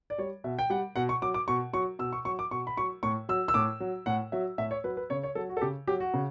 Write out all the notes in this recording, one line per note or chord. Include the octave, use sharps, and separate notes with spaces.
D5
G3 C#5
B2 E5
G5
G3 F#5
B2 F#5
C#6
F#3 D6
D6
B2 C#6
F#3 C#6
B2 E6
C#6
F#3 C#6
D6
B2 C#6
B5
F#3 C#6
A2 C#6
F#3 E6
E6
A2 D6
F#3
A2 F#5
F#3 E5
A2 E5
C#5
F#3 B4
B4
C#3 C#5
C#5
F#3 A4
F#4
A4
C#3 G4
F#3 G4
F#4
C#3